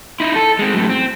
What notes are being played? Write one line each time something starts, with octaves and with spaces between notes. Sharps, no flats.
D#4 E4
A4
G#3 C4
F#2 A2
C4